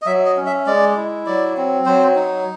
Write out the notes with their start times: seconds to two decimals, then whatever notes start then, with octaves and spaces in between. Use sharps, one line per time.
0.02 D#5
0.06 F#3 E5
0.26 D#5
0.37 C#4
0.46 E5
0.66 G#3 D5
0.97 E4
1.26 F#3 D5
1.57 C4
1.86 F#3 C5
2.16 D#4